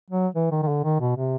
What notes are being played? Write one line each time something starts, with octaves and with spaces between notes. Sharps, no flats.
F#3
E3
D#3
D#3
D3
D#3
B2
C3